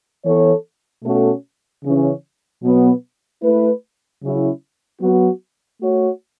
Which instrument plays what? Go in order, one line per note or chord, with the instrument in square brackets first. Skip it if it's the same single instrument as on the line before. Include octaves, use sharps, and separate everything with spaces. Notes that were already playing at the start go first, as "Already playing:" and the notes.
[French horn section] E3 B3 A4 C#5
B2 A3 C#4 F#4 A4
C#3 E3 C#4
B2 F#3 B3
A3 E4 B4
C#3 F#3 C#4 E4
F#3 B3 F#4
A3 F#4 C#5